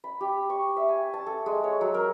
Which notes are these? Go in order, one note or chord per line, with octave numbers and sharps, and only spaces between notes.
B5
G4
C#6
E5
G#5
A5
A4
G#3
C#5
F#3
A#4